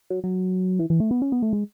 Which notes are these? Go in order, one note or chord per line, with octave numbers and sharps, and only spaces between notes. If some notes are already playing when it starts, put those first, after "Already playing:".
F#3
F#3
E3
E3
A3
B3
C#4
B3
A3
G#3